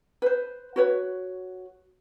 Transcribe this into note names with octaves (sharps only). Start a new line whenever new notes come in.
B4 C5
F#4 B4 C#5